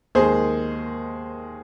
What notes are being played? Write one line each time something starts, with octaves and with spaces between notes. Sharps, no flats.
D#2 D#3 G#3 G#4 C5